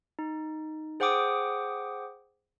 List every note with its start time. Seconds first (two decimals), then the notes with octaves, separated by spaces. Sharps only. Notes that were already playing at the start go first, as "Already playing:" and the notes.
0.19 D#4
1.00 G#4 C5 F#5 G5 D6 D#6